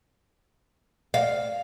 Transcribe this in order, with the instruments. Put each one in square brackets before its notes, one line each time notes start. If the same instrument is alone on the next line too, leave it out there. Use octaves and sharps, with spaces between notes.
[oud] F5